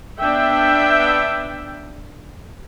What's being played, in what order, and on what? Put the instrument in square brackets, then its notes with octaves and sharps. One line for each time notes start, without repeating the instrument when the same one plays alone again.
[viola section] B3 D4 E5 G5